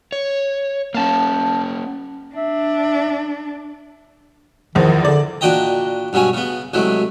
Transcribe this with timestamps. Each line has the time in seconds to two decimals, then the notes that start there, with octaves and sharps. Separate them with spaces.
0.12 C#5
0.95 A#3 C#4 F5 A5
2.36 D4 E5
4.75 A#1 E2 D#3 F3
5.05 D3 D5
5.41 A#2 D4 F#4 D#5 G5 A#5
6.13 G2 B2 F#3 C#4 G#5
6.34 C#3 B3
6.73 C2 F#3 G#3 A3